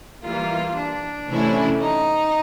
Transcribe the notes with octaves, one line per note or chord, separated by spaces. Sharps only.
E3 G3 A#3 F4
D4
C3 E3 A3 C#4 E4
D#4